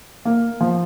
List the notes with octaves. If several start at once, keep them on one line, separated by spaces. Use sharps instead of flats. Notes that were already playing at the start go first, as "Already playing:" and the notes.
A#3
F3